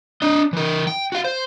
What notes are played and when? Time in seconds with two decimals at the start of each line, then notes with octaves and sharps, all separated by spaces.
0.22 D4 D#5
0.53 E3 A#4
0.87 G5
1.12 F#4 F5
1.24 C5